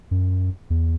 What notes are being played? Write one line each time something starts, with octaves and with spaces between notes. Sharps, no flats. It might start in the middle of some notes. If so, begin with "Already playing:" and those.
F#2
E2